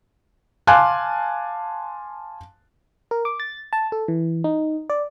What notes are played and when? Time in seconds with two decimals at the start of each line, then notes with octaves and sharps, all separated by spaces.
0.67 F5 G#5 A5 C6 D6 F#6
3.11 A#4
3.25 D6
3.40 A6
3.73 A5
3.92 A4
4.08 E3
4.44 D#4
4.90 D5